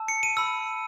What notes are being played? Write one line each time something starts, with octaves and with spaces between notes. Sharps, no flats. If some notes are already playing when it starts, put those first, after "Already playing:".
Already playing: A5 E6
C#7
D#7
B5 E6